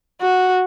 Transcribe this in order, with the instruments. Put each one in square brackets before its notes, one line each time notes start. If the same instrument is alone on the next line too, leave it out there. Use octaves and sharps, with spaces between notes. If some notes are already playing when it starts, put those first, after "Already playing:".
[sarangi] F#4